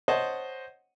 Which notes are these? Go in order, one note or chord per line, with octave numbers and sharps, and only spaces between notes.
C5 C#5 D#5 F#5 A5